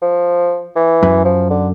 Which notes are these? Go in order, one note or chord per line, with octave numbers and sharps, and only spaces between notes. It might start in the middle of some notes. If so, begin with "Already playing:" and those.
F3
E3
F#2
F3
D3